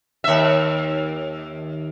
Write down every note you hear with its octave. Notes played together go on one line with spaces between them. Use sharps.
D#2 E5